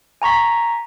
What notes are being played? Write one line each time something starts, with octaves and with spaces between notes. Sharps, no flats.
G#5 A#5 C#6 B6